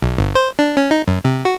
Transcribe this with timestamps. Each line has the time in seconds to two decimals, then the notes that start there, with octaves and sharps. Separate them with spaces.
0.02 B1
0.18 G1
0.35 C5
0.59 D4
0.77 C#4
0.91 D#4
1.08 F#2
1.25 C3
1.45 F#4